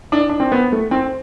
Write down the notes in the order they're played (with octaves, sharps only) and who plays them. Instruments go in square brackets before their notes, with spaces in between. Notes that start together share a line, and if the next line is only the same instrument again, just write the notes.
[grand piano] D4
D4
C4
B3
A3
C4